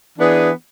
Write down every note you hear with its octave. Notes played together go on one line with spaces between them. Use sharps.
E3 B3 D4 G#4